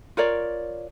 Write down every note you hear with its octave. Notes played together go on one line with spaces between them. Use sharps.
F4 A#4 C#5 D5